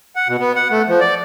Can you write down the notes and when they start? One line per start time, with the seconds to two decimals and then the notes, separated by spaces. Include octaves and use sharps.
0.16 F#5
0.28 B2
0.40 B3
0.56 F#5
0.71 A3
0.88 F3
1.00 D5